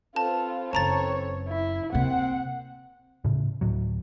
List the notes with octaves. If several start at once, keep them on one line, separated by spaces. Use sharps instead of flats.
C4 F4 A4 B4 A5
F#1 F#2 C#5 A5 A#5 A6
E4
C3 A#3 C4 F#5
A2 C#3
D2 A2 F#3